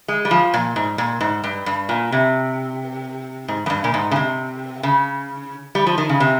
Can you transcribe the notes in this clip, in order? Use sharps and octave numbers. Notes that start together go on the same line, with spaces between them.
G#3
G3
F3
A#2
G#2
A#2
G#2
G2
G2
A#2
C3
G#2
F2
G2
A#2
G#2
C#3
C3
C#3
G3
F3
D#3
C#3
C3